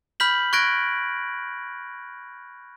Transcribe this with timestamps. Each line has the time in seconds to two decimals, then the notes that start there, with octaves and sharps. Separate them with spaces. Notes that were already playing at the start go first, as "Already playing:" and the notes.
0.20 B5 F6 G6 B6 F#7
0.53 C#6 F#6 G#6 A#6 D7